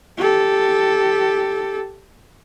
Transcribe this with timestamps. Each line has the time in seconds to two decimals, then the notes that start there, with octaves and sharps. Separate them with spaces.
0.18 G4 A4